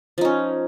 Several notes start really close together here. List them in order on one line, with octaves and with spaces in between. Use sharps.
F3 D#4 C#4